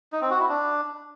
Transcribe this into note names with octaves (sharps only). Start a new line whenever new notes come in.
D#4
C4
F#4
E4
D4